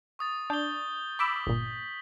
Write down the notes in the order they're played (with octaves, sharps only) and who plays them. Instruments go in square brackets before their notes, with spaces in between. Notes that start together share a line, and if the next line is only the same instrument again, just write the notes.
[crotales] C#6 D#6 A6
[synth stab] D4 [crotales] G6 G7
[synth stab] B5 D6 E6 [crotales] B6 F#7
[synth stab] G1 A#2